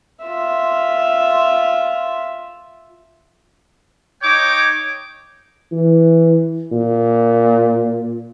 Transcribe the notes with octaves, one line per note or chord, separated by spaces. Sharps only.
F4 E5
D#4 C#5 G5 D6
E3
A#2